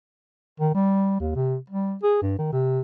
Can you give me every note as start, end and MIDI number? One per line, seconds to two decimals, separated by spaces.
0.60 0.72 51
0.75 1.19 55
1.20 1.34 39
1.35 1.57 48
1.70 1.95 55
2.03 2.19 68
2.22 2.37 43
2.38 2.48 51
2.53 2.81 48